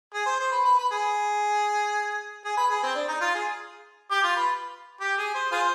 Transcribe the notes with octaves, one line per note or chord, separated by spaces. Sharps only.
G#4
C5
C5
B4
B4
B4
G#4
G#4
B4
G#4
C4
D4
D#4
F4
G#4
G4
F4
B4
G4
G#4
C5
F4 G#4 C5